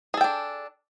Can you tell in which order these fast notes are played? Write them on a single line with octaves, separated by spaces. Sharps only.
G#4 A4 G5 D4